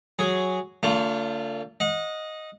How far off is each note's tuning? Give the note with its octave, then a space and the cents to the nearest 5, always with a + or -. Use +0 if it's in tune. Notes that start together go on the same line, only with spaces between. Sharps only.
F#3 +0 G#4 +0
D3 -30 A3 +45 F4 +0
D#5 +0 F#5 -35